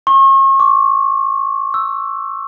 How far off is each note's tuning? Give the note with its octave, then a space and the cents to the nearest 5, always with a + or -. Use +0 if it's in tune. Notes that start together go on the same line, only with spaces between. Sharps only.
C#6 -40
C#6 +45
E6 +5